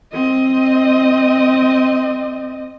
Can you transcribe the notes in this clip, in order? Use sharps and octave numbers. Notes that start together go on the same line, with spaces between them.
C4 D#5